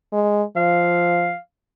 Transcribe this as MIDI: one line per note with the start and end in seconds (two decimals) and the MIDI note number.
0.13 0.43 56
0.56 1.33 53
0.56 1.37 77